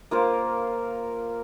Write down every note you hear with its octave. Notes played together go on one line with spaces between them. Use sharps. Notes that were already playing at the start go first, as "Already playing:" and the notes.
A#3 F4 A#4 C5